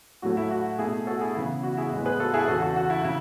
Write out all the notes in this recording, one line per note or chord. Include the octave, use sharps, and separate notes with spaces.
A2 F#3 A3 F#4
E4
F#4
B2 A3 E4 G#4
F#4 A4
E4 G#4
C#3 E3 B3 E4
F#4
E4 G#4
A2 G#3 B3
G#4 B4
F#4 A4
E4 G#4
E2 C#3 E3 F#4 A4
F#4
F#4
E4
C#3 E4